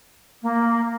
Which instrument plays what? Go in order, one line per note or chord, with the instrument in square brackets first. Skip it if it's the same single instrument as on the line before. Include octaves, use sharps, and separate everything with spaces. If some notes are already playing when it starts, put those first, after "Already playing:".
[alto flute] A#3